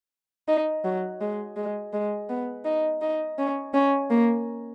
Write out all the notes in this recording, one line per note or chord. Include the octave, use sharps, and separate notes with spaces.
D#4
F#3
G#3
G#3
G#3
B3
D#4
D#4
C#4
C#4
A#3